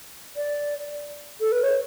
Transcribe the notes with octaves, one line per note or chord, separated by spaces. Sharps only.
D5
A4
B4
C#5